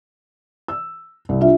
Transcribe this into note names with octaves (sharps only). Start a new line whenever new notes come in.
E6
C2
D4 F4 E5